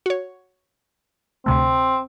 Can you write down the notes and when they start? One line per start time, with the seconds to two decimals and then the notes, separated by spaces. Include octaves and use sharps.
0.06 F#4 C#5
1.46 D2 C3 A3 C4